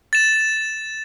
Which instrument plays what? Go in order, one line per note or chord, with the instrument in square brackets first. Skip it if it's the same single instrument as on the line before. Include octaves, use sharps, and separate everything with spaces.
[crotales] A6 E7